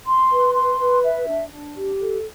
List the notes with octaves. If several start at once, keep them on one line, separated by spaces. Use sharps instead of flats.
C6
B4
C6
B4
E5
D4
D4
G4
A4